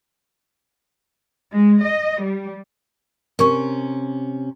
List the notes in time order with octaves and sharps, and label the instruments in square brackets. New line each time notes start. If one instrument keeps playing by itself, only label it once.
[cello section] G#3
D#5
G3
[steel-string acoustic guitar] C3 C#4 [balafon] A#4 C#6